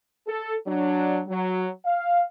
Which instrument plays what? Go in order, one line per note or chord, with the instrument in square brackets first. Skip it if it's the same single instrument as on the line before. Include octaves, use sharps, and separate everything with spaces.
[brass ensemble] A4
F#3 D4
F#3
F5